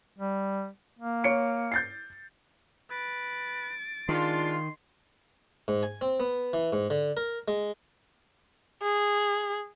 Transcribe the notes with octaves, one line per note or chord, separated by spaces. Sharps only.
G3
A#3
C#5 C#7 D7
G6 A6 C7
B4 A6 D7
D#3 G#3 D4 F4 C6
G#2
G#5
C4
B3
E3
G#2
D3
A#4
G#3
G#4